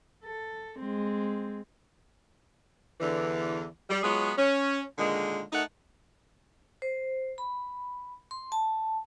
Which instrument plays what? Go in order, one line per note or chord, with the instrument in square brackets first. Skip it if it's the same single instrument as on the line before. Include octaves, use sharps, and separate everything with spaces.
[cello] A4
G#3 C4
[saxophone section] E2 D3 E3
G3
F#3 G#3 B3 F4 G#4 C#5
C#4
A#2 D3 D#3 G#3
A3 D#4 A4 A#4 D#5 F#5
[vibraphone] C5
B5
C6
A5